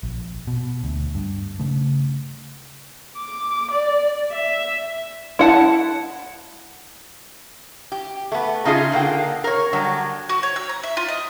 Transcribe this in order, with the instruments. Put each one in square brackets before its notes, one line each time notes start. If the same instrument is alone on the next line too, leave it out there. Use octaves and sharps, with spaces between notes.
[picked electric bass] A#1
B2
D2
G2
C#3 A3
[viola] D6
D5
E5
[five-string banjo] E4 F#5 A5
[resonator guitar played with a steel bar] G4
A3 B3
C#3 D#4 F4 G#4
A#2 D3 A#3 G5
A#4 C#5
D3 F#3 G3
[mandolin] F#4
C#5
E6
A#5
E5
F4
D#5